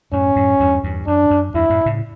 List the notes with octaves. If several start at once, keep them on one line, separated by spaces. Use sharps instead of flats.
F#2 A2 C#4
F#2 A2
E2 G2
E2 G2
F#2 D4
F#2
E2 G2 E4
F#2 A2
A2 C#3